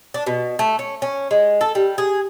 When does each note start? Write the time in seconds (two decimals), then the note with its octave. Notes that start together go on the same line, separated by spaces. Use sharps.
0.14 D4
0.26 B2
0.59 A3
0.79 C#4
1.02 C#4
1.31 G#3
1.61 A4
1.75 G3
1.98 G#4